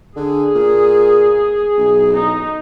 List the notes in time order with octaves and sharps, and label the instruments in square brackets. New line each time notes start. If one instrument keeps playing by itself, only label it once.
[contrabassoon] D3 [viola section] G#4
[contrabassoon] A#2
B1
[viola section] D#4